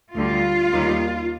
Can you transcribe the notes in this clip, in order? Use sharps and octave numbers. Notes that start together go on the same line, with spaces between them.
D2 D3 G3 F4
D#2 D#3 G3